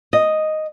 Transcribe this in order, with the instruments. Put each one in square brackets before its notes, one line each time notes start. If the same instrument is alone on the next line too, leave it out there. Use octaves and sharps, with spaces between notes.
[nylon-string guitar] D#5